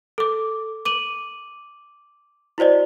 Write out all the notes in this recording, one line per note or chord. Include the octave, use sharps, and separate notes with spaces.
A4 D6
D6 D#7 F#7
E4 F#4 C5 D5 D#5